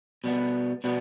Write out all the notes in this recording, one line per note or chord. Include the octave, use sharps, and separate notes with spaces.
B2 G3 B3
B2 G3 B3